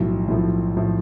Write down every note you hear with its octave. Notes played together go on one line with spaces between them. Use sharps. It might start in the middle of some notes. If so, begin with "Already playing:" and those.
Already playing: B1 A2 F3
B1 A2 F3
A2 F3